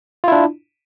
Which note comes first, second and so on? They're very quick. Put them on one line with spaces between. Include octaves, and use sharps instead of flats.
F4 E4 D4